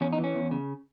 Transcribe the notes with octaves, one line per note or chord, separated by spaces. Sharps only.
E2 C#4
D#4
E3
C#4
E2
C#3